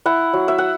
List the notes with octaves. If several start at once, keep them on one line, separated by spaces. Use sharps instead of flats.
E4 F#5
F#3
E5
F#5